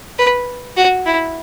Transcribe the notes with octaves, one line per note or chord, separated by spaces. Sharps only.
B4
F#4
E4